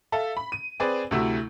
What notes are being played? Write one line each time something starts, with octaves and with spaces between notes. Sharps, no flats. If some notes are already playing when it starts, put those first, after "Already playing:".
A4 E5 F5
B5
D#7
C4 G#4 B4 D5
D2 C3 A3 E4 F#4 E6